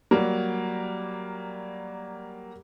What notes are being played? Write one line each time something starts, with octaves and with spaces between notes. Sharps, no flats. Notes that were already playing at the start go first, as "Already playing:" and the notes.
F#3 G3 A#3